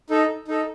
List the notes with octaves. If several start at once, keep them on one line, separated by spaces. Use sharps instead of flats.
D#4 A4
D#4 A4